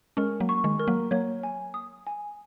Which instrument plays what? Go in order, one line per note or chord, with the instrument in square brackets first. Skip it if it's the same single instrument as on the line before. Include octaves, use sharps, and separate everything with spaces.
[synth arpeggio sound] G#3 C#4 [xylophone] A#4
[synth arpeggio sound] F#3 A#3
[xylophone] C#6
[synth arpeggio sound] D#3 G#3
[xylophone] A#4
[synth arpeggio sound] F#3 A#3
[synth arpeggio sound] F#3 A#3 [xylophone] C#5
[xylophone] G#5
D#6
G#5